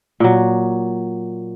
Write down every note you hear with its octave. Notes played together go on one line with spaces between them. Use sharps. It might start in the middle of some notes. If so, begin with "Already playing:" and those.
A#2 F#3